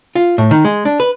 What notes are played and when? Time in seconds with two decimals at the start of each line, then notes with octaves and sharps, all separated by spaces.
0.15 F4
0.38 A2
0.51 D#3
0.65 G#3
0.85 D4
1.00 B4